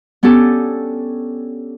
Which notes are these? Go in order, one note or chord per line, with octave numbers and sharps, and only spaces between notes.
B3 C#4 D4 G4 A4